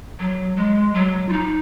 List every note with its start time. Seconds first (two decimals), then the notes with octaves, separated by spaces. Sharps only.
0.19 F#3
0.57 G#3
0.94 F#3
1.29 F4
1.32 D#4